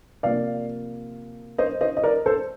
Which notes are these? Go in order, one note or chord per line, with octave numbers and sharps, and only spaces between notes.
C3 F3 A#3 D5 F5
C5 D#5
C5 D#5
D#5
A#4 D5
A4 C5